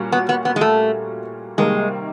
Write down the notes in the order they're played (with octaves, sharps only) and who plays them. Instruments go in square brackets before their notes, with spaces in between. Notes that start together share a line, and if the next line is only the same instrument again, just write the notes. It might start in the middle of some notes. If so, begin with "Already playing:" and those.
Already playing: [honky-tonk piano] A#2 G3 A#3 C#4 F#4
[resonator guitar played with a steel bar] B3
B3
B3
G#3
A3
[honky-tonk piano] C3 D#3 G3 A#3 [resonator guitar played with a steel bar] G#3